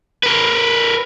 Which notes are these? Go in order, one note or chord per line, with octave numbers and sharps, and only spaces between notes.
A#4 B4